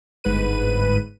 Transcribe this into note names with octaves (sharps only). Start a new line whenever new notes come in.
G1 G#2 B4 D#7